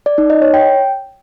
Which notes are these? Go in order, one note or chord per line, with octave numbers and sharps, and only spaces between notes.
D5
D#4
D#5
C#5
G5